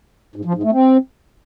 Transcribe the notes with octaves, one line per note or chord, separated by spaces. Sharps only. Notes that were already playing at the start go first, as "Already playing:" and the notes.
G#2
F3
G#2
A3
C4